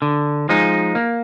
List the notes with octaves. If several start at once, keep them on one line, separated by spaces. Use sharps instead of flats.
D3
F3 G#3 D#4
A#3